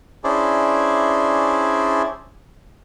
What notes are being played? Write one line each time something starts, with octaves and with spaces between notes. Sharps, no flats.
C#4 D4 E4 G#4 C5 D5